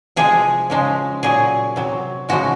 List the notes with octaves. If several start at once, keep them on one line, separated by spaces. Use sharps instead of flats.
C3 F3 G#3 G#4
C#3 F3 G#3
A#2 F#3 G#4
C3 F#3
C#3 F3 G#3 F#4